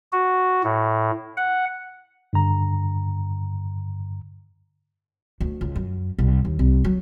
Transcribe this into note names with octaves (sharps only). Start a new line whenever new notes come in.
F#4
A2
F#5
G2 D3 A#5
D2
C#2
F#2
C2
D#2
C2
F#3